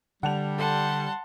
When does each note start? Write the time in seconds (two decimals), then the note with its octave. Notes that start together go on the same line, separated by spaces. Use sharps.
0.23 D3 G3 F#5 A5 F7
0.58 A4 F#5 A5 C6